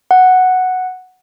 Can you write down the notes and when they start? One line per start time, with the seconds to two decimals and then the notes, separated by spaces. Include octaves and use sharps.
0.11 F#5